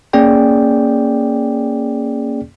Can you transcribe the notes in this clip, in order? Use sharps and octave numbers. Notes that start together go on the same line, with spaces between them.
A#3 C#4 G#4 D5 G5